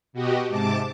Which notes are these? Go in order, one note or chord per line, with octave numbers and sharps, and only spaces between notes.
B2 F#4 G4 D#5
G#2 C3 A5 D6